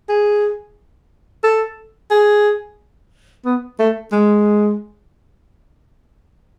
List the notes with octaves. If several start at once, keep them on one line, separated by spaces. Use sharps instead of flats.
G#4
A4
G#4
B3
A3
G#3